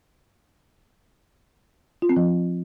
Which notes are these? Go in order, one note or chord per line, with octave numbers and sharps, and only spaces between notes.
F4
C4
F3